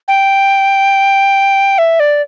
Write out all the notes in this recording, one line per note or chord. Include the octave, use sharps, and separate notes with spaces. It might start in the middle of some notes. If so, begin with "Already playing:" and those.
G5
E5
D5